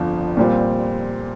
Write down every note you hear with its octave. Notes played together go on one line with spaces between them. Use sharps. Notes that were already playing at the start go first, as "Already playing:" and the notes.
Already playing: G1 F2 D3 F3
A#2 G3 C4